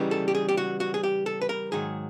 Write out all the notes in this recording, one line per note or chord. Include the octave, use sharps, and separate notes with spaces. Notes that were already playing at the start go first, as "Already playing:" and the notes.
Already playing: C#3 E3 G3 B3 D#4
A4
G4
G#4
G4
F#4
F#4
G#4
G4
A4
B4
A#4
G#2 D#3 F#3 G#4